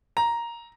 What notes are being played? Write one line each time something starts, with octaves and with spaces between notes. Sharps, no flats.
A#5